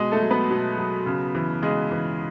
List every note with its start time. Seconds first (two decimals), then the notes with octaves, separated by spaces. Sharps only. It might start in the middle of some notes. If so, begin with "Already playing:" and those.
Already playing: B2 G#3 G#4
0.12 A3 A4
0.21 F#3
0.30 B3 B4
0.50 B2
0.78 F#3
1.06 C#3
1.35 E3
1.62 C#3 G#3 G#4
1.92 E3